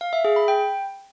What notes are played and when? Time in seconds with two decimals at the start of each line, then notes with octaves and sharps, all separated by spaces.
0.01 F5
0.13 E5
0.25 G#4
0.36 B5
0.48 G5